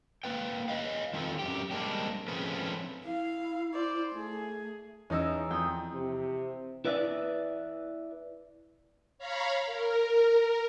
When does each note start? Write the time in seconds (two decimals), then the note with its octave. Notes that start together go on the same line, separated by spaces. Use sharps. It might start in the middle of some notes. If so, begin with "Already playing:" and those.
0.24 A#3 B4 G5
0.68 B4 D#5 F5
1.14 D#3 C4 F4 A4
1.39 F#2 G4
1.71 G3 G#3 A#3 C4 D4 G4
2.28 F3 A3 C4 C#4 G#4 B4
3.05 E4 F5
3.73 C5 D5
4.14 A3 G#4
5.10 E2 C#4 D#4 A#5 E6
5.51 F2 G5 D#6
5.94 C3
6.85 E4 B4 D5 E5
9.18 C#5 F5 A#5 B5
9.66 A#4